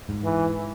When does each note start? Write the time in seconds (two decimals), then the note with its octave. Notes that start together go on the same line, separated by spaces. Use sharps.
0.09 G#2
0.25 E3